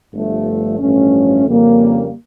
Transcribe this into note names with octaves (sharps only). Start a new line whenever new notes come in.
G1 G2 F3 A3
A1 G2 F3 A3 C#4
F2 C#3 G3 A#3 C#4